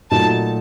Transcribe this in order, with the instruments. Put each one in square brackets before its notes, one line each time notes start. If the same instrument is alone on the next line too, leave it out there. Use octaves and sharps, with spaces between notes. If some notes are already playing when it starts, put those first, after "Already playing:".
[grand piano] A#2 F#3 A3 D#4 [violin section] A5